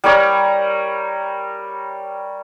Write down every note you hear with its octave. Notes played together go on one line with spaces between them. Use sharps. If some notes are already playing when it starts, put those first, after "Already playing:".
G3 A#4 C#5